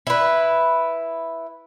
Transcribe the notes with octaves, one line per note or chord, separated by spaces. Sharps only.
E4 B4